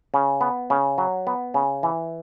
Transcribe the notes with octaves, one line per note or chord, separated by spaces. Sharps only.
C#3
B3
C#3
F#3
B3
C#3
E3